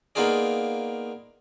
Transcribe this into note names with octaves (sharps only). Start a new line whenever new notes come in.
A#3 B3 D#4 F4 G#4 D5